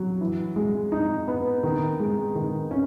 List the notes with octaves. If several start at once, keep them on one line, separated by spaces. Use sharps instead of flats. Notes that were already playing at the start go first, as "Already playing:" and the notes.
Already playing: F#3
E3
G#3
D#4
B3
D#3
G#3
D#3
C#4